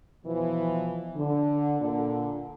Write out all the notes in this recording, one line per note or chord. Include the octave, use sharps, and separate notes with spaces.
B2 E3 F3
D3
A#2 D3